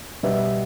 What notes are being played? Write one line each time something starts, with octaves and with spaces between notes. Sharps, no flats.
B2 G3 B3 E5